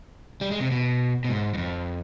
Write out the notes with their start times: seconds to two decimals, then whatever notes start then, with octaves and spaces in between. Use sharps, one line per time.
0.41 G3
0.51 G#3
0.60 C3
0.71 B2
1.25 B2
1.30 G#2
1.54 G2
1.57 F2